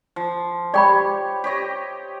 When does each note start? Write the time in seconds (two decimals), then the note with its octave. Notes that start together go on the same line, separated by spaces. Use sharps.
0.16 F3
0.74 G4 C#5 D5 G5 B5
1.44 G4 C#5 D#5